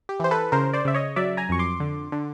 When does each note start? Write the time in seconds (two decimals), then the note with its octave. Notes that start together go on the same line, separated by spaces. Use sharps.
0.09 G4
0.20 E3 C5
0.31 A4 B4
0.52 C#3 A#4 C5
0.73 C5 D5
0.85 C#3 E5
0.94 C#5 D#5
1.16 F#3 D5 E5
1.37 G#5 A#5
1.49 F2 C#6
1.59 C6 D6
1.80 D3
2.12 D3